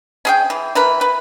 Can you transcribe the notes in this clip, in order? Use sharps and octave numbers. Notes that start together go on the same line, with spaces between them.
C#4 G#4 G5
E3
E3 A#4 B4
B4